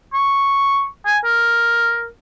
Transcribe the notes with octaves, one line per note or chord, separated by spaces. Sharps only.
C#6
G#5
A#4